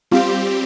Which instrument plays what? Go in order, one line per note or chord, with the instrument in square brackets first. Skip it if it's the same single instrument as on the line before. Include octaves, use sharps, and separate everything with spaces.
[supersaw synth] G3 C4 G4 [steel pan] F4